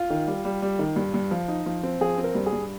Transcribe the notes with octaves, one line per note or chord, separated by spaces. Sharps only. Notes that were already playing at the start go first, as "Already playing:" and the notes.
Already playing: F4
D#3
G3
G3
G3
D#3
G2
G2
F3
D#4
F3
C4
F3 G#4
C4
A#4
G2
G#4
G2